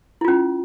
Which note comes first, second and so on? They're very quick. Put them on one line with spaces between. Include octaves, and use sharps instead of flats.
E4 F4 C#4